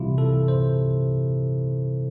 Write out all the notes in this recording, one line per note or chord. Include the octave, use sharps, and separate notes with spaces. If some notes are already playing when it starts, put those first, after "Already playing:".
Already playing: C3 E3 G3 E4 F4
A4
C5